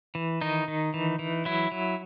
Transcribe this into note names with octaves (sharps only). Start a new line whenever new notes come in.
E3
D#3 D#4
D#3
E3
E3
F#3 E4
F#3